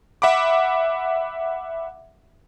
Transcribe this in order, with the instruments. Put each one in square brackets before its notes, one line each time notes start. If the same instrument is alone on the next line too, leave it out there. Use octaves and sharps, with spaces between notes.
[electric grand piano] E5 F#5 B5 D6